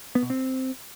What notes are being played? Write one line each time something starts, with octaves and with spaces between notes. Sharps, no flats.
B3
B2
C4